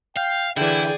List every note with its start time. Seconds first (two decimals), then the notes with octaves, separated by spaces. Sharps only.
0.16 F5 G5
0.57 D3 E3 E4 G#4 D5 G5